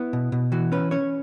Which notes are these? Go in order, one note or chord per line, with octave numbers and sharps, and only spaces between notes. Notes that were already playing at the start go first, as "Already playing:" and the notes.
Already playing: B3 E4
B2
B2
E3 F#4
C#4 B4
C#4 C#5